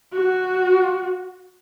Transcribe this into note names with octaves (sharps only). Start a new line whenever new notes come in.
F#4